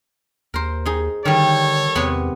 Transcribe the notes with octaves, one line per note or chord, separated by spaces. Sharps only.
D#2 A#4 C5
D#4 G#4
D3 D#3 G3 A4 C#5
E2 C3 B3